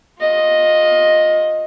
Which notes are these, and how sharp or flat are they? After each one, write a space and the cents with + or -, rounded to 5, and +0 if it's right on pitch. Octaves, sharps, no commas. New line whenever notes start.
F4 +25 D#5 +0